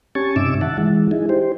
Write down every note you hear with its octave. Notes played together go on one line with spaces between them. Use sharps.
C#4 G4 G#5 A5 C#6
G2 C3 D#4 E5 D6 E6
D#3 E5 F#5 A5
E3 G#3
D#4 E4 G#4
G4 C5